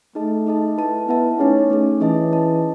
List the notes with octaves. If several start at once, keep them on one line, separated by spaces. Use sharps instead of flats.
A3 D#4 G#4 D#5 A5
D#4 G#4 D#5 A5
E4 B4 E5 A5
B3 E4 B4 E5 A5
A3 C#4 D#4 G#4
A3 D#4 G#4
E3 C#4 G#4 D#5 A5
C#4 G#4 D#5 A5